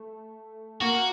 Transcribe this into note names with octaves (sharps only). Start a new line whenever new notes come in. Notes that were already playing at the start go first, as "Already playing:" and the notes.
Already playing: A3
A#3 F#4